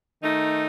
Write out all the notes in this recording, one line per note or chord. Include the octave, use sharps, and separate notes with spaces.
D#3 A3 D#4